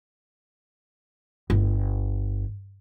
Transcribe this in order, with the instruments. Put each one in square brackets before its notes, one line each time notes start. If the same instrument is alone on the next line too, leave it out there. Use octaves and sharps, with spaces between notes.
[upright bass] G1